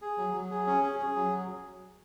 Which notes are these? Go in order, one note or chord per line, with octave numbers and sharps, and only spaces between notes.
G#4
F#3
F#3
G#4
C#4
G#4
G#4
F#3